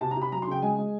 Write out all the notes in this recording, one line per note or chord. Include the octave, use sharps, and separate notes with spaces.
C3 A5
A#5
C3
B5
F#3 A#5
C6
C#3 G5
G#3 G#5
G#3